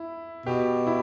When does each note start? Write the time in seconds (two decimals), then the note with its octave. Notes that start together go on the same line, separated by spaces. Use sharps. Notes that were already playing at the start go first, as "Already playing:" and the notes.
Already playing: E4
0.46 B2 G4
0.87 E4